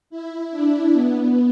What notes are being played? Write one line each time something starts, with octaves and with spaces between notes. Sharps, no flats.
E4
D4
B3